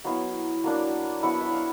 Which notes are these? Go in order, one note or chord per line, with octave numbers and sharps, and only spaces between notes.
F#3 B3 E4 F5
F#3 A#3 D4
F#3 B3 E4 F#5
E5
F5